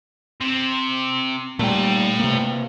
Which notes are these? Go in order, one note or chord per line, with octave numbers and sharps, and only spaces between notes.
C3
A#2 G3 A3 G5
C3 A#3